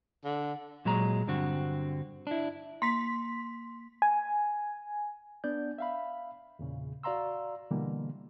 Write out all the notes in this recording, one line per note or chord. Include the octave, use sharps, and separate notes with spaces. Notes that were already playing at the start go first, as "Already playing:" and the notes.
D3
A#2 F#3 G#3 A#5
G2 D3 C4 F#4
D4 E4
A#3 C6 B6
G#5
B3 D4 D5 G6
E5 F5 B5
E2 A#2 C#3
F#4 D5 F5 A#5 C6 E6
B2 D3 E3 G3 A#3